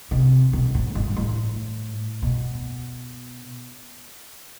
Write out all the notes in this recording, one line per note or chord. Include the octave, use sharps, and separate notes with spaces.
C3
B2
A2
G2
A2
B2